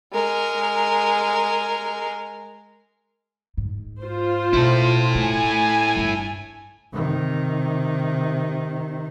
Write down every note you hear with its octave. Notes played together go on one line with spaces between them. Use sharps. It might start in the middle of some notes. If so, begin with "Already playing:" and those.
G#3 A#4
G#2
F4 C5
B2 C4 E4 A4
A3 G#5
G1 D4
C3 D#3